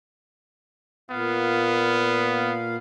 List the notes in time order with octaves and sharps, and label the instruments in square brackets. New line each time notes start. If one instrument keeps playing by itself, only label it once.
[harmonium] A#2 F5 [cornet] B3